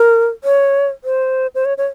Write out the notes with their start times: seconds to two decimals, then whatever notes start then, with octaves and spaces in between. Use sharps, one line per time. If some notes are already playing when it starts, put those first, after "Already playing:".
Already playing: A#4
0.44 C#5
1.04 C5
1.55 C5
1.65 C#5
1.78 C#5